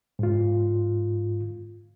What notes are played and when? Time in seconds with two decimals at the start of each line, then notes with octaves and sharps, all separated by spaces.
0.19 G#2 F4